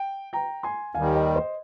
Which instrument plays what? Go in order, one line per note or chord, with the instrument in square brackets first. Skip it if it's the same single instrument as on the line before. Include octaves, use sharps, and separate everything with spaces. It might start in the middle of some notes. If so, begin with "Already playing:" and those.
Already playing: [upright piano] G5
G5 A#5
G#5 C6
[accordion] D#2 D#3 G3 [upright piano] F5 G#5
[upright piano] D#5 G5
C5 D#5